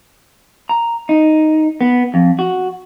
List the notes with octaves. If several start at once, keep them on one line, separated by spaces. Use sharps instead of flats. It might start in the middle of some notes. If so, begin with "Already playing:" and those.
A#5
D#4
B3
F2
F#4